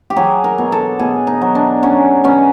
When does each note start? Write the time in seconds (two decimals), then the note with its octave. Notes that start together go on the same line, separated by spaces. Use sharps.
0.10 G4
0.16 F#3 G#4
0.44 A#4
0.58 B2
0.72 A4
0.99 B2 G#4
1.27 D#4
1.42 F#3
1.55 D4
1.83 F#3 C#4
2.24 B2 C#4